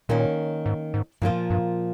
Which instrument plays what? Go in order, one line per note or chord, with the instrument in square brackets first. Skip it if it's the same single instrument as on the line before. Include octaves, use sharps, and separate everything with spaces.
[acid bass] A#2 [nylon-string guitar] D#3 A#3 C#4
[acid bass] G#2
G#2
[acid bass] G2 [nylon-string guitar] A#2 F3 A#3 F4
[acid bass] G2